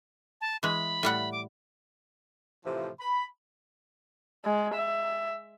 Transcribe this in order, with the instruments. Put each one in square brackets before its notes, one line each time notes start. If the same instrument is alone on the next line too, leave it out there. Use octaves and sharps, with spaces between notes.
[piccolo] A5
[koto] E3 G#3 [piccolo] B5
[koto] A2 G3 F#5
[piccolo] D6
[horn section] A2 C3 E3 F3
B5
[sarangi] G#3
E5